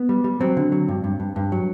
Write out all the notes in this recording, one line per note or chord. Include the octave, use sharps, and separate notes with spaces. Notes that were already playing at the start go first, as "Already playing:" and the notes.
Already playing: B3
G3
G3
F#3 C4
D3
F#3
G2
G2
G2
G2
F#3